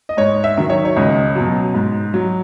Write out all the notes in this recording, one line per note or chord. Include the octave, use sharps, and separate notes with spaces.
D#5
G#2 C#5
E5
D#3 F#3
C#5
C#5
C#2 D#5
B2 F#3
G#2
F#3